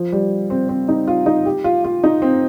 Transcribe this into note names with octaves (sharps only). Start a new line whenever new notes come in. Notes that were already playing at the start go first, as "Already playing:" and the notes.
Already playing: F3
G3
C4
C4
D#4
F4
D#4
G4
F4
F4
D#4
C4